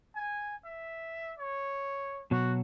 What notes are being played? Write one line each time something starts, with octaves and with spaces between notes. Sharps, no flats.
G#5
E5
C#5
B2 F#3 F#4